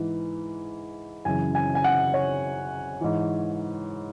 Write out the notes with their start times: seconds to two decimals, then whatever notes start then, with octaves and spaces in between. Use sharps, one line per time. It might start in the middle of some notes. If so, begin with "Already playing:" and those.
Already playing: G#2 E3
1.25 F#2 C#3 E3 G#5
1.55 G#5
1.75 G#5
1.84 F#5
2.14 C#5
3.01 G#2 E3